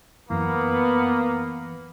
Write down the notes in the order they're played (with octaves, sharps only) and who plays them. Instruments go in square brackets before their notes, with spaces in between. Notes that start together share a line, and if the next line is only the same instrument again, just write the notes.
[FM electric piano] F#2 E3 [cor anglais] A#3 [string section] B3